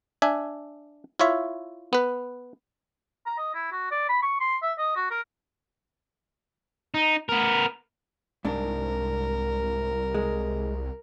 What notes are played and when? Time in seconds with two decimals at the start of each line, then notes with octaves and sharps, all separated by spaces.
0.22 D4 E5 G#5
1.19 E4 F4 C#5 E5
1.93 B3 B4
3.26 A#5
3.38 D#5
3.54 E4
3.72 F#4
3.91 D5
4.08 B5
4.22 C#6
4.40 C6
4.62 E5
4.78 D#5
4.96 F#4
5.11 A#4
6.94 D#4
7.29 B3 A#4
8.45 C2 G#2 D4 A#4
10.14 G#3